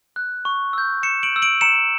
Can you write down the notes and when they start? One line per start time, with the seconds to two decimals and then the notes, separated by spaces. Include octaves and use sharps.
0.16 F#6
0.45 C#6
0.73 E6 G6
1.03 C#6 C#7 E7
1.23 D7 F#7
1.32 E6 G6
1.42 D7 F#7
1.61 A#5 C#7 E7